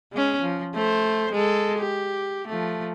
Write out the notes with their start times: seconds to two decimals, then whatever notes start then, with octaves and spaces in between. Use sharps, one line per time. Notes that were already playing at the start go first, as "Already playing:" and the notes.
0.12 G#3 C#4
0.42 F3
0.74 A3 C5
1.32 G#3 A4
1.79 G4
2.48 F3 A3